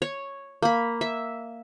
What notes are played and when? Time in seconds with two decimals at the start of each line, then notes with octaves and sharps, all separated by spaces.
0.02 C#5
0.62 A#3 B5
1.01 E5